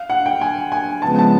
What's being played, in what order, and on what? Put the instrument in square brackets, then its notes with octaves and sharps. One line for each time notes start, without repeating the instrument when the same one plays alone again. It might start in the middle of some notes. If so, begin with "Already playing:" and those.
Already playing: [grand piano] F5
F#5
G5
G#5
G#5
[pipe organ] C#3 F3 G#3 B3 [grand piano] A5
[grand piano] A5